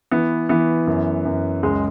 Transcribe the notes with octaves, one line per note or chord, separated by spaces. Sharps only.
E3 B3
E3 B3
F#2
F#2
C#2 G#3